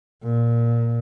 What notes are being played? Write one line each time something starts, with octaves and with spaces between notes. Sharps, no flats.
A#2